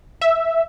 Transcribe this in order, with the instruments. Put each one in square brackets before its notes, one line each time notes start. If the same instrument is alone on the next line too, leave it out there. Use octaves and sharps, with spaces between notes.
[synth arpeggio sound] E5